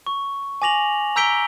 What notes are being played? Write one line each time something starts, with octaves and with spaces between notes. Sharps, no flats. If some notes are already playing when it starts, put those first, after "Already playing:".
C#6
G#5 D6 A#6 F7 F#7
A#5 E6 G6 B6 D7 G7